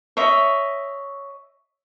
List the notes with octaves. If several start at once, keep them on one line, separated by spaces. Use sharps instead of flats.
C#5 D#5 E5